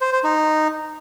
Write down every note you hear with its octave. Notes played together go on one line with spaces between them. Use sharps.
C5
C5
D#4